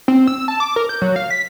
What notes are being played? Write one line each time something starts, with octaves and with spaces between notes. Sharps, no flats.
C4
E6
A5
D6
A#4
G6
F#3
F5
B6